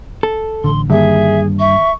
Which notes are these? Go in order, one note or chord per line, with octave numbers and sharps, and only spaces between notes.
A4
A1 D3 C6
G2 D3 D#3 A#3 G#4 E5
E5 C#6